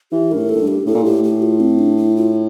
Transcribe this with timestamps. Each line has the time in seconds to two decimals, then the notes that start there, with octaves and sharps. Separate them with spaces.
0.12 E3 G4
0.31 G2 A#4
0.37 A2
0.49 A4
0.56 A2
0.61 G2
0.68 G4
0.86 A2 A4
0.94 A#2
1.02 A2 G4
1.24 G4
1.42 F4
1.60 C4
1.79 D4
1.97 E4
2.16 F4